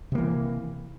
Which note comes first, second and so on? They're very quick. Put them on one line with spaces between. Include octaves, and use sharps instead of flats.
C3 A#3 E3